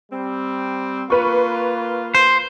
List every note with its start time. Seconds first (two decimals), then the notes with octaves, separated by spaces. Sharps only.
0.12 G3 C4
1.10 A#3 F4 B4 C#6
2.15 C5